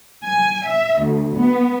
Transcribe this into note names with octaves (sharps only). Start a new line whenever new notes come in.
G#5
E5
D2
B3